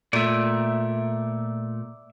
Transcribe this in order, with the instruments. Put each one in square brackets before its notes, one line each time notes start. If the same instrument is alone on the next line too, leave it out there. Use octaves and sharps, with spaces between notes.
[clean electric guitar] A#2 A3 [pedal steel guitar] D5 E5